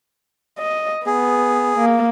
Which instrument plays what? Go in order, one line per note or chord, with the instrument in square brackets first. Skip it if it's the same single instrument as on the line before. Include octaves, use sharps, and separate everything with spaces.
[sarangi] D#5
[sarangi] B3 [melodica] G#4
[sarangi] A#3